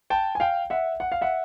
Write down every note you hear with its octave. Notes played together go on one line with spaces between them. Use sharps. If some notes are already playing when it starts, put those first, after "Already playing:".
G5 A5
G#5
F5 G5
E5 F#5
F#5
F5
E5 F#5